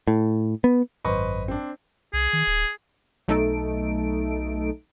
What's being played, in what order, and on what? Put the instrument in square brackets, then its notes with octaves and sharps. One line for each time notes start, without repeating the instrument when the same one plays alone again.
[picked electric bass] A2
B3
[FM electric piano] G#1 F#2 C5 [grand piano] B4 D#5 C#6
[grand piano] C4 D4
[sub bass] C2 [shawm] G#4
[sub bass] D#3
D1
[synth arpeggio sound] B1 A3 D#4 A4 D7